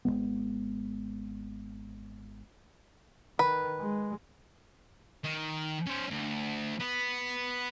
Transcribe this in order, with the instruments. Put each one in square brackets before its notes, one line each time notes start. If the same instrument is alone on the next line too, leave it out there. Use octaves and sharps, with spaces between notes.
[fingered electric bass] G#1 E2 G#3 B3
[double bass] D#3 [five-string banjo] B4
[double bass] G#3
[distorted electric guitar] D#3
C#4 C5
D2
B3